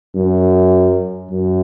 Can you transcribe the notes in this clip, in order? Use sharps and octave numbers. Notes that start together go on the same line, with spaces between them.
F#2
F#2